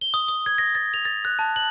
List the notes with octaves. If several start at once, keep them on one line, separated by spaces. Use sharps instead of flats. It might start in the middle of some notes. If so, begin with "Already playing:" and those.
G7
D#6
D#6
G#6
A#6
A6
F7
A6
F#6
A5
F#7